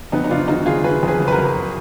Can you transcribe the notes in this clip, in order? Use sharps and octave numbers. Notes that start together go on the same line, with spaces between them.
F2 B3 D#4
D#4
F#1 D4 F4
D#3 D#4 F#4
F#1 F4 G#4
F#1 G#4 B4
F2 G#4 B4
F#1
B4
F#4 A#4
F#1